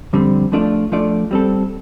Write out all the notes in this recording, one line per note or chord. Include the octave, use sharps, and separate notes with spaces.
F2 D3 G3 C4
F3 A3 D4 F4 D5
F3 A3 D4 F4 D5
G3 C4 A4